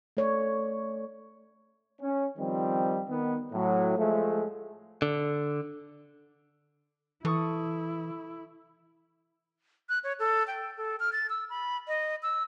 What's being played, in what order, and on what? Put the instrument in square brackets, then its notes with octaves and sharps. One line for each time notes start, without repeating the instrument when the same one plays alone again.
[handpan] A3 C#5 D5
[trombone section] C#4
D#3 F3 G3 C4
D#3 B3
A2 F#3
F3 G#3 A3
[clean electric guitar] D3
[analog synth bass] E3 [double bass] E4 [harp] A4 C#6 D#6
[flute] F#6
C#5
A4
G5
A4
F6
A6
E6
B5
D#5
E6